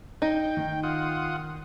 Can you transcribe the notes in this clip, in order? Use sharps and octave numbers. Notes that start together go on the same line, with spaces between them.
D#4 G5
D#3
F4 F#5 D#6